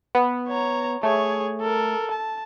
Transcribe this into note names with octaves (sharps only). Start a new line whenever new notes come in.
B3
C#5 A#5
A3 G#4 C#5
A4 A#4
A5